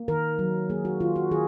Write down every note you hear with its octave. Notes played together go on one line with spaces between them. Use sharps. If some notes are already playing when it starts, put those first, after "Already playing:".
Already playing: A#3
D#3 A#4
F#3
A#3 G#4
F#4
D#3 F4
F#4
D#3 G#4